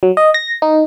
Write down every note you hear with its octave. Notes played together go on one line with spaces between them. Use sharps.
F#3
D#5
A#6
D#4